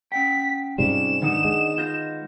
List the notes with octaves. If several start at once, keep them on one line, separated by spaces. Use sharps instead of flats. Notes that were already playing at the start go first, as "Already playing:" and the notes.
C#4 F#5 G5 B6
G#2 C3 G3 C#4 F4 E7
D#3 B3 D4 F#5 D#6
G#3
B3 F4 G6 A#6